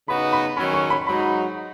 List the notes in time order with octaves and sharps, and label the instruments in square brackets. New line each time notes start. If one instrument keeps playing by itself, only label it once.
[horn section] C#3 B3 D#4 F#4 [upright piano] B5
[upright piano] B5
[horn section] D#3 F#3 C#4 [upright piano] B5
[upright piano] C#6
B5
[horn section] G#2 F#3 D#4 F#4 [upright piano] B5